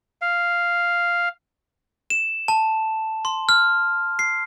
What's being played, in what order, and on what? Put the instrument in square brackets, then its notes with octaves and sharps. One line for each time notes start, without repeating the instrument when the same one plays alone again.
[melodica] F5
[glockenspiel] E7
A5
C6
F6
C7